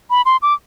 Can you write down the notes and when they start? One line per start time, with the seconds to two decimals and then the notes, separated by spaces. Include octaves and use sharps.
0.10 B5
0.25 C6
0.42 D6